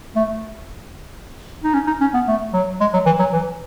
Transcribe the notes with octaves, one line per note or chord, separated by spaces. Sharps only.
A3
D#4
C#4
D#4
C#4
B3
A3
F#3
G#3
F#3
E3
F#3
E3